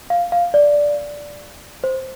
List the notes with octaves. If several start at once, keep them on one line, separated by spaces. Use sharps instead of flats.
F5
F5
D5
C5